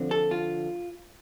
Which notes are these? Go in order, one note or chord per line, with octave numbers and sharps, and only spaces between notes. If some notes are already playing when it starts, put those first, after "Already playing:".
Already playing: D3 F3 C4
A4
F4